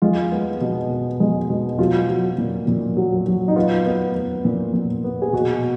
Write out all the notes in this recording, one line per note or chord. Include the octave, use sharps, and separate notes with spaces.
G#3 F4
B3
B2
B3
G#3
B2
F#3 F4
F#3
A#2
A#2
F#3
F#3
D#4
B3 F4
B3
B3
A#2
A#2
B3
G#4
B2 F#4